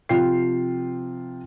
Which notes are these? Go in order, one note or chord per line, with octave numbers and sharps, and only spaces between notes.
C3 F3 F4 G5 C7